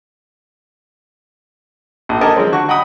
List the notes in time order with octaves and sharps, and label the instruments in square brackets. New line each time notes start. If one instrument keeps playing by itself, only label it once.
[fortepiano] A#1
G4 A4 A#4 D#5 G#5 A5
F3 G#3 C4
D3 F#4 C#6
D#5 F#5 G5 A#5 B5 D#6